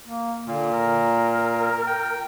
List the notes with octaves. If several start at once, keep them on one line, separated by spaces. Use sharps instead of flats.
A#3
A#2 D3
A#4
G5